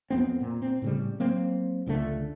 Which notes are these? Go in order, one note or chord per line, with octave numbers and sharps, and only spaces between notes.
F2 B3 C4
A#2
C4
A2 C#3 G3
F#3 A#3 C4
F1 C#2 D3 A3